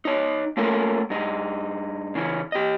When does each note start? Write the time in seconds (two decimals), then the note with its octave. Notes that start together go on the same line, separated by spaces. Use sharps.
0.05 D#4 C#5
0.57 A3 A#3 C#4 F4 A4 A#4
1.10 G2 D#4
2.15 C#3 E3 C#4
2.52 G4 D#5